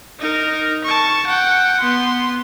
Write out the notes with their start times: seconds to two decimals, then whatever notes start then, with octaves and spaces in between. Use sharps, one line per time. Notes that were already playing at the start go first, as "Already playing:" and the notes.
0.19 D#4 A#4
0.84 A5 C#6
1.26 F#5 G5
1.80 B3 C6